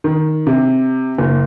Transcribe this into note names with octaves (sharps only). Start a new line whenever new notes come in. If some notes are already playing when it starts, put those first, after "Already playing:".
D#3
C3
F#1